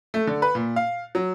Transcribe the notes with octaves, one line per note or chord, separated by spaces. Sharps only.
A3
D3
B4
A#2
F5
F#3